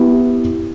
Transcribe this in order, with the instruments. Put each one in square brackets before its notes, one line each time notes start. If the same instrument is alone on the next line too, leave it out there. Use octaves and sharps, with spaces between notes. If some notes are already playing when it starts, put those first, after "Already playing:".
Already playing: [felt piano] B3 E4 G4